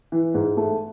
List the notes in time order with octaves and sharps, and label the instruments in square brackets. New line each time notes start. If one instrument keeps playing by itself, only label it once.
[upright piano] E3
G#2
A3